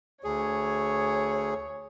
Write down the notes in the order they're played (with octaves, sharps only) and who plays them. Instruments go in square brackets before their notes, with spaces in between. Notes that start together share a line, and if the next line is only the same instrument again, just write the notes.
[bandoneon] D2 G#4 [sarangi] C#5